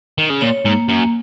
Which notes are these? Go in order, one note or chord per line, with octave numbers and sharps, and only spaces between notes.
D#3
C#3
A#2 C#5
G#2 A#3
F#2 A#3